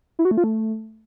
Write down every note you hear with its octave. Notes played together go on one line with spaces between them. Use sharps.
E4
F#4
A3
F4
A3